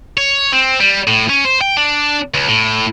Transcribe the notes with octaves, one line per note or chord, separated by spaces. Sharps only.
C#5
C4
G3
A2
C#4
C5
G5
D4
C#2
A2